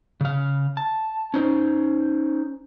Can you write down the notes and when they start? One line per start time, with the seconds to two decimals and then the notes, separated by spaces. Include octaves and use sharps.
0.21 C#3 F5
0.77 A5
1.34 C#4 D#4 C5